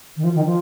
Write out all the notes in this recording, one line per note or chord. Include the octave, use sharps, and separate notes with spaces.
D#3
F3
D#3
F3